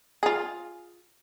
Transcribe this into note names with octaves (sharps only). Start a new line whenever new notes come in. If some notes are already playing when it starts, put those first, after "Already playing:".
F4 G#4